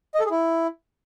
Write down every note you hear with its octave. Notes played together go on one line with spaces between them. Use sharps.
D#5
A4
G#4
E4